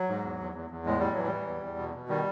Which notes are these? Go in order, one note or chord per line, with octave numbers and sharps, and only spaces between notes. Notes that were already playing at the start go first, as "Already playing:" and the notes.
Already playing: F#3
G#2
E2
E2
E2
E2
A2 G#3
A2 G3
E3 F#3
E3 G3
E2
E2
B2
B2
D#3 G3